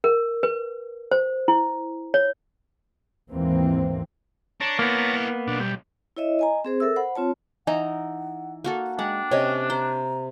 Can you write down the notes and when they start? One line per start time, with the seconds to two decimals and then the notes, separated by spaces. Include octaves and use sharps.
0.04 A#4
0.43 B4
1.11 C5
1.48 E4
2.14 C#5
3.30 D#2 G#2 E3 A#3 C4
4.61 D4 C#5 A5 A#5
4.79 A#3 B3 E4 A#4
5.48 B1 D4
5.60 G3
6.17 E4 C#5 D#5 E5
6.39 D#5 G#5 A#5
6.65 C4 G#4 C5
6.80 A4 A#4 E5 E6
6.96 C5 F#5 B5
7.15 C4 F4 C#5 A5
7.67 E3 D#4 D#5 F#5 A#5
8.64 A#3 F#4 A4
8.99 G#3 D4 F#5 G5
9.31 C3 C#4 C#5 D#5
9.70 C5 A#5